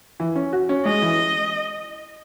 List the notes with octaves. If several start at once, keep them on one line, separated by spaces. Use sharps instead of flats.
E3
C#4
F#4
C#4
G#3 D#5
E3